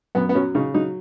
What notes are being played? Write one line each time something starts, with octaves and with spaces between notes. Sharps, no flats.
F#2 B3
B3
F#3 C#4
C#3 D#4
F#3 D#4